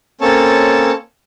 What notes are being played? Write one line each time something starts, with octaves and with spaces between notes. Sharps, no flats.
A#3 C4 C#4 A4 C#5 A5